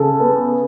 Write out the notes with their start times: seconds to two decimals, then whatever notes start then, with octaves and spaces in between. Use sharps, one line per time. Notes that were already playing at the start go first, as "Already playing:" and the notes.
Already playing: C#3 A4
0.20 B3